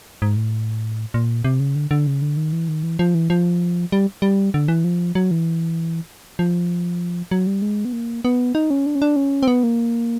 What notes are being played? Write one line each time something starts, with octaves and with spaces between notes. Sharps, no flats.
G#2
A2
A#2
C3
C#3
D3
D3
C#3
D3
D#3
E3
D#3
E3
F3
E3
F3
G3
G3
D3
E3
F3
F#3
E3
F3
F#3
G3
G#3
B3
A#3
B3
D#4
C#4
D4
C#4
D4
C#4
C4
B3
A#3